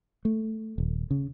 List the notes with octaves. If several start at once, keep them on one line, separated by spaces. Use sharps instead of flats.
A3
D#1
C#3